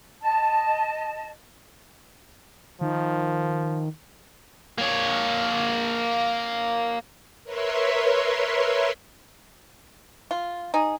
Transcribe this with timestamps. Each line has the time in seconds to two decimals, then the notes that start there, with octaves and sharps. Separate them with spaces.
0.21 D#5 A5
2.81 D#3 F3
4.78 A#3 C#5
7.44 A#4 B4 C#5 E5 C6
10.31 F4
10.74 D#4 G#4